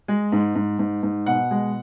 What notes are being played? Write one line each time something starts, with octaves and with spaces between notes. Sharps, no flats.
G#3
G#2
G#2
G#2
G#2
B2 F#5
G#3